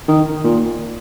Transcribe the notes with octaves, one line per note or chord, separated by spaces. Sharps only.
D#3
A#2